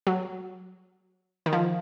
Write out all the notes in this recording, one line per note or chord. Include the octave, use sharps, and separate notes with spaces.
F#3
D#3
F3